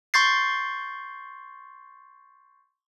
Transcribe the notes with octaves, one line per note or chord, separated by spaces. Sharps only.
C6 C#6 G6 A6 C7